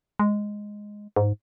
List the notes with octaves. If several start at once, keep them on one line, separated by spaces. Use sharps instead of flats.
G#3
G#2